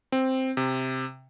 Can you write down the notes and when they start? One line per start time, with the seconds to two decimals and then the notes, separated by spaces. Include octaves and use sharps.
0.12 C4
0.57 C3